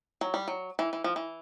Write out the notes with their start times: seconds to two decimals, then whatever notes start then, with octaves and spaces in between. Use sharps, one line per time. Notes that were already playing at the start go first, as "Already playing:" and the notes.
0.21 F#3
0.34 G3
0.48 F#3
0.79 E3
0.93 E3
1.04 F3
1.16 E3